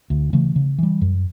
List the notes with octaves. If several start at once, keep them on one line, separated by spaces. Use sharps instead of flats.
D2
C#3 E3 A3
C#3
E3 G3
F#2